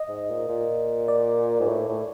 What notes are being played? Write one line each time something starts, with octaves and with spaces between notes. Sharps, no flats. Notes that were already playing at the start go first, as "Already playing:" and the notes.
Already playing: D#5
G#2
A#2
A#2
D5
G#2
A2
A2